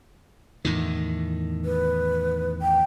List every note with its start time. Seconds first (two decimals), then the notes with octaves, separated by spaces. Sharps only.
0.65 E2 A2 D#3
1.65 B4
2.62 G5